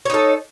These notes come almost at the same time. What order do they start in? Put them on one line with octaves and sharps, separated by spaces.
C#5 D#4 A4